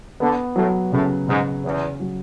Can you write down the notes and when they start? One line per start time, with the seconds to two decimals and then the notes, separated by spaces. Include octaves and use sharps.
0.20 D3 B3
0.56 A2 F#3
0.92 A2 C#3
1.28 G#2 C#3
1.64 E2 C#4
2.00 F#3